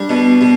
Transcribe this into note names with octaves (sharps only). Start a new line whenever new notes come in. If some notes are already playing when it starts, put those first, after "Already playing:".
Already playing: G3 D4
B2
B2